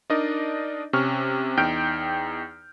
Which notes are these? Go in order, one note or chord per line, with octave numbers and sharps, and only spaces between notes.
D4 D#4 A#4 D5 D#5
C3 C#4 C#6 F6
E2 D#4 G5 F6 G6 D7